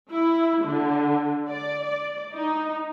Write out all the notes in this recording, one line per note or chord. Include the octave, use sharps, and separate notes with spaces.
E4
D3
D5
D5
D#4